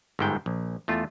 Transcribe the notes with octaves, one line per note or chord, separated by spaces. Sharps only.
G1 G#2 G5
A#1
E2 A3 F4